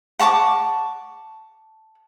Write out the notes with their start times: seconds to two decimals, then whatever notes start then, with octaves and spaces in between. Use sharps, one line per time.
0.19 F#5 A5 C#6 D6